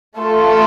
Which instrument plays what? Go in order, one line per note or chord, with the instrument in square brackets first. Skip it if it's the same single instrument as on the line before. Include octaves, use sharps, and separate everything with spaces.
[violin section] A3 F4 A4